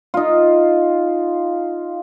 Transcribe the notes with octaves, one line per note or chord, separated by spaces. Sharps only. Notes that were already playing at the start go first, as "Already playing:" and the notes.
D#4 F4